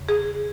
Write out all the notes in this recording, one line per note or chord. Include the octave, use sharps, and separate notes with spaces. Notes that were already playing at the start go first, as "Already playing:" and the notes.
Already playing: E2 C#3
G#4